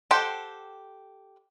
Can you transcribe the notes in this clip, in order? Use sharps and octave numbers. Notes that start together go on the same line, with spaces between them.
G4 A4 C5 F#5 G5